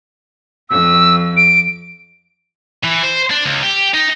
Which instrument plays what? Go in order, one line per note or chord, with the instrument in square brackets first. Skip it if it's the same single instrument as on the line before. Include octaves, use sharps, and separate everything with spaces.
[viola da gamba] F2 [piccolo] E6
[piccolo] D7
[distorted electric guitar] E3
C5
D4
C#2
G4
D#4